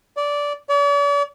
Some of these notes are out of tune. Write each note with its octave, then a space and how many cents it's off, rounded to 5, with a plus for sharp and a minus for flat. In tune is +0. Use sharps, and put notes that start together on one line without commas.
D5 -15
D5 -45